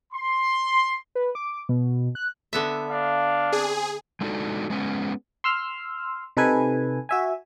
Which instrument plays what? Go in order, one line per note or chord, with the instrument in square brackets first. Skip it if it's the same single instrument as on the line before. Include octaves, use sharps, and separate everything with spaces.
[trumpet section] C6
[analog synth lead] B4
D6
B2
F#6
[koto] D3 B3 E5
[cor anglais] D4 [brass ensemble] F5
[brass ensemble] C4 [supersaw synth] G#4
[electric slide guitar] G#3 A3 D4 D#4 F#4 A4
G#3 B3 C#4
[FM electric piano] C6 E6 F6
C3 D#4 A4 B4 G#5
F#4 E5 G#5